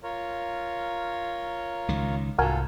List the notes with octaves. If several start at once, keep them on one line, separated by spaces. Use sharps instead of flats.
F4 A#4 C#5
C#2 D#3
C2 G#2 F4 F#4 A4 A#4 G#5